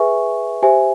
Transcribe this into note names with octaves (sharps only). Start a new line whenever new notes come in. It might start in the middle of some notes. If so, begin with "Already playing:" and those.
Already playing: G#4 B4 E5 G#5 C#6
G4 C5 E5 G#5